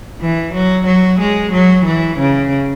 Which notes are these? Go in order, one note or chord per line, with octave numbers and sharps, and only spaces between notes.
E3
F#3
F#3
G#3
F#3
E3
C#3